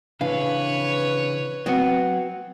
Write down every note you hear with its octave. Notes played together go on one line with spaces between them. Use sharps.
C#3 E3 D4 B4 C#5 F5
F#3 B3 C4 F#4 F#5